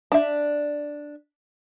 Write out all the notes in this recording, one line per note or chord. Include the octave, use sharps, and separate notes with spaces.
D4 E5